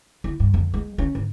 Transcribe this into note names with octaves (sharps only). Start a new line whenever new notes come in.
E4
G2
F2
G#3
C#4
G#2